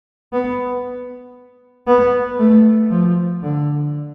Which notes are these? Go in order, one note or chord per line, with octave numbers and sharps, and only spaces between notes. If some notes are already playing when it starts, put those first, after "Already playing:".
B3
B3
A3
F3
D3